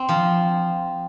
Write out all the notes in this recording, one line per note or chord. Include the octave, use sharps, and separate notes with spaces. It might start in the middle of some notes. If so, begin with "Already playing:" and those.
Already playing: C4
F3